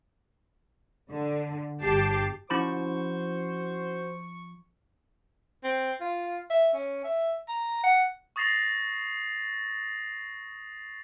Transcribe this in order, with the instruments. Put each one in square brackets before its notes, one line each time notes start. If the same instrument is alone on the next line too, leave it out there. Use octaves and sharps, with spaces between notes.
[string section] D3
G1 G4 A5 C7
[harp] F3 C4 [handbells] C#4 E4 B5 [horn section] F#4 C5 [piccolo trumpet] C#6
[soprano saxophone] C4
F4
E5
C#4
E5
A#5
F#5
[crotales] C#6 D#6 A6 A#6 C7 F7